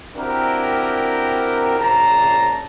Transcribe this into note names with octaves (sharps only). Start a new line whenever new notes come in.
C4 D4 E4 F#4 G4 A#4
A#1 C#3 C5 D5 A5 A#5